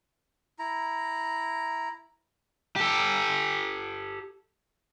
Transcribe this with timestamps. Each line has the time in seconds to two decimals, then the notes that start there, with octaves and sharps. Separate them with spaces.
0.59 E4 A#5
2.76 G4 A4